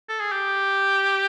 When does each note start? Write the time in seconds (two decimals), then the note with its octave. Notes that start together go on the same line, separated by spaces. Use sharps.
0.09 A4
0.20 G#4
0.32 G4